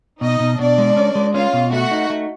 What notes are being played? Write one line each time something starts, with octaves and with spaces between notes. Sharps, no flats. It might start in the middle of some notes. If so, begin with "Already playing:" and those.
B2 D#4 D#5
B2
B2 D4 D5
G#3
C#4
G#3
C#4 F4 F5
B2
A3 F#4 F#5
D#4
A3